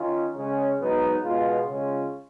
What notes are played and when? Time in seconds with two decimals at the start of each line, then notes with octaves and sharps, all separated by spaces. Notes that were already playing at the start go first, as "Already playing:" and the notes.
Already playing: D#3 C#4 F4
0.34 C#3 G#3 C#4
0.79 G#2 F#3 B3 D#4
1.23 B2 G#3 B3 F4
1.68 C#3 G#3 C#4 F4